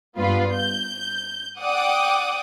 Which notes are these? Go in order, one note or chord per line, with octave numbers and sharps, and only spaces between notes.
G2 B3 F4 B4
G6
D5 F#5 G5 D6 D#6